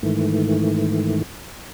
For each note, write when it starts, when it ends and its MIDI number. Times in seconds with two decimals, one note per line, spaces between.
0.03 1.22 44
0.03 1.22 51
0.03 1.22 52
0.03 1.22 57